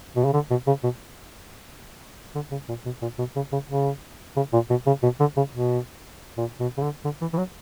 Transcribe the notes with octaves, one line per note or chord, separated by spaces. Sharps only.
B2
C#3
D3
B2
C#3
B2
D3
C#3
A#2
B2
A#2
B2
C#3
C#3
C#3
C#3
A#2
B2
C#3
B2
D3
C#3
B2
A#2
B2
C#3
D3
D3
E3
E3
F#3